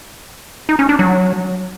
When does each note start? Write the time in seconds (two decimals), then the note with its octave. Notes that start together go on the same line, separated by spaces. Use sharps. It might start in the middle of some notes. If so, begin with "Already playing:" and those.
0.69 D#4
0.79 C#4
0.89 D4
0.99 F#3